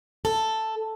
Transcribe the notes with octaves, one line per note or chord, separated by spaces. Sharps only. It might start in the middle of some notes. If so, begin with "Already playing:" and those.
A4